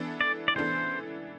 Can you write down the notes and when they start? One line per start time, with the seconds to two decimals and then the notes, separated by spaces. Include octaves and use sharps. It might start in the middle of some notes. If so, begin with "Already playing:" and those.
Already playing: E3 B3 D4 A4
0.21 D5
0.48 D5
0.56 E3 B3 D4 A4 C5